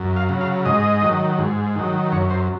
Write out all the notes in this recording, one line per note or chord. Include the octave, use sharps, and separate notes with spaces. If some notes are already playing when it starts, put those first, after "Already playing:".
Already playing: F#2
F5
C#3 F#3
F5
G#2 D#5
D#3 F#3
G#2
D#3 F#3
F#2 C#5
C5